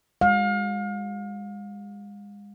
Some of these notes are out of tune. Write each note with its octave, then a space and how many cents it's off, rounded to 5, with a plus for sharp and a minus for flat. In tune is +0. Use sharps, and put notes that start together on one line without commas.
G#3 -35 F5 +35